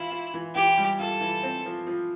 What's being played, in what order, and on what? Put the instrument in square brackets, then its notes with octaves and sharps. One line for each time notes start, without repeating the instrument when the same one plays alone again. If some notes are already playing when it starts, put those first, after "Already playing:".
Already playing: [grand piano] E3 F4 [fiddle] E4
[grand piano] F4
E3
[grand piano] E3 [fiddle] G4
[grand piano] G3
[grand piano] F4 [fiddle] A4
[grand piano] E3
C4
F3
F3